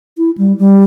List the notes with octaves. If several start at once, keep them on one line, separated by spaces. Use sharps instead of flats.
E4
G3
G3